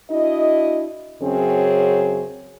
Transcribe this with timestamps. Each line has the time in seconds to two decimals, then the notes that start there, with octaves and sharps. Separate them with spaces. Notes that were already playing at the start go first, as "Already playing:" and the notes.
0.10 D4 E4 F#4 D#5
1.22 F#2 C#3 F#3 C4 C#4 G#4